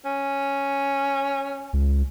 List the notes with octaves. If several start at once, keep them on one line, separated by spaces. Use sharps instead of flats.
C#4
C#2